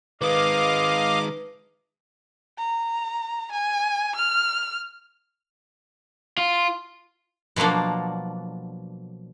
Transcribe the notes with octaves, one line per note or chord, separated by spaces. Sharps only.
D#3 G#3 B4 D#5 F5 D6 D#6
A#5
G#5
F6
F4
B2 F3 F#3 A#3 D4